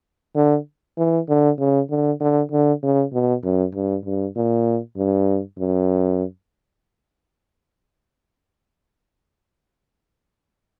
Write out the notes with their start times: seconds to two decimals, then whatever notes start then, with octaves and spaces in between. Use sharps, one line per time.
0.36 D3
0.98 E3
1.29 D3
1.59 C#3
1.90 D3
2.20 D3
2.52 D3
2.83 C#3
3.13 B2
3.44 F#2
3.74 G2
4.05 G2
4.36 A#2
4.97 G2
5.59 F#2